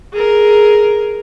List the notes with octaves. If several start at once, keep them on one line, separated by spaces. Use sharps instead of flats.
G#4 A#4